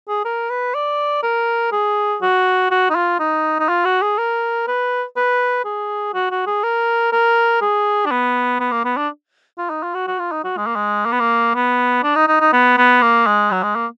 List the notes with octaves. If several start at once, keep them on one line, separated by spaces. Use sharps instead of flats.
G#4
A#4
B4
D5
A#4
G#4
F#4
F#4
D#4
F4
D#4
D#4
F4
F#4
G#4
A#4
B4
B4
G#4
F#4
F#4
G#4
A#4
A#4
G#4
D4
B3
B3
A#3
B3
D4
F4
D#4
F4
F#4
F#4
F4
D#4
F#4
G#3
A#3
G#3
A#3
B3
A#3
B3
D4
D#4
D#4
D#4
B3
B3
A#3
G#3
F#3
G#3
A#3